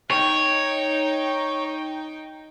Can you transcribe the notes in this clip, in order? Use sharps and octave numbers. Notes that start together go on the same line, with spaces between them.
D#4 C#5 G5